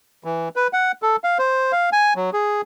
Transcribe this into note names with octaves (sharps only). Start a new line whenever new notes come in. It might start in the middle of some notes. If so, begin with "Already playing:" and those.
E3
B4
F#5
A4
F5
C5
F5
G#5
F#3
G#4